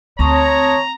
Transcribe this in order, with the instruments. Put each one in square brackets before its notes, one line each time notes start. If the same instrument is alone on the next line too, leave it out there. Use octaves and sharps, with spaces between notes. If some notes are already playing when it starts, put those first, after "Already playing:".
[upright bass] D2 [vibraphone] C4 A5 D#6 [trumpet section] C#5 [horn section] A#5